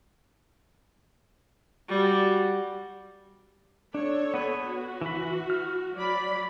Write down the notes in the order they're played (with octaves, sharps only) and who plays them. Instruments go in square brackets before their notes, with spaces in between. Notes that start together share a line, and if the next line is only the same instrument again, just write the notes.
[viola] G3 F#4
[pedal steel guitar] D4 [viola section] A4 C#5
[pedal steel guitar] B3 B4
[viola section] F#4
[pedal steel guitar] E3 B5
F6
[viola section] F#3 D5 B5